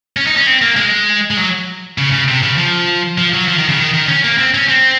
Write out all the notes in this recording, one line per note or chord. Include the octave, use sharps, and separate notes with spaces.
C#4
D#4
C#4
C4
A#3
G#3
G#3
F#3
C#3
C#3
C3
C#3
F3
F3
F#3
F3
D#3
C#3
D#3
D#3
C#4
A#3
C4
C#4
C4